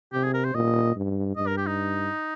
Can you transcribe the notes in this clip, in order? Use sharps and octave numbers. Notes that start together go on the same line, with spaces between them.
C3 G4
G#4
A#4
C5
A#2 D#5
G2
G2 D#5
A#4
G4
D#4